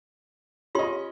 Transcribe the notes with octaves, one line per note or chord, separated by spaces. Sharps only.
C#4 F4 G4 D#5 C6